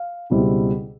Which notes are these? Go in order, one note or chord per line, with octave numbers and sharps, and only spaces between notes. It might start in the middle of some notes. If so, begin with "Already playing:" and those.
Already playing: F5
C#2 B2 G3 C4 E4